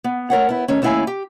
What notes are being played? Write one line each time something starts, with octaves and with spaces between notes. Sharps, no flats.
B3
A3 A#4 C#5 F#5
B3 E4
D#3 A3 C#4
D#2 A3 C#4 E4 F5 G#5
G4